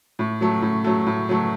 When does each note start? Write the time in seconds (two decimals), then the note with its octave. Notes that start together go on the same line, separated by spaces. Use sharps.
0.19 A2
0.41 F#3 A3
0.62 A2
0.84 F#3 A3
1.06 A2
1.29 F#3 A3